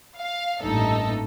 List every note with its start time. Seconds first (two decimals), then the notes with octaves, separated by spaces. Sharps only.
0.18 F5
0.62 A1 G2 A#2 A3 D#4 A4